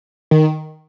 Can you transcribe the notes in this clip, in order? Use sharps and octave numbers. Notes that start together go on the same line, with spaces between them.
D#3